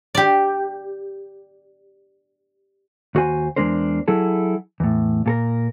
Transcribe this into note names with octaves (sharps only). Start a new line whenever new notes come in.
G4 D5
D#2 F#4 C5 G#5
E2 B2 G#3 D4 A#4 C5
F#3 E4 G#4 A4
E2 A2
A#2 A4 A#4